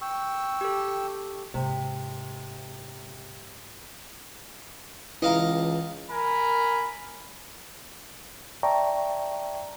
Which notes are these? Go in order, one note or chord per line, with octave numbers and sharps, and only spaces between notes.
G5 C#6 E6
G4 A4
G#2 C3
C#2 E3 D#5 F5 A#5
A#4 G#5 B5
D5 E5 G5 A5 A#5 C#6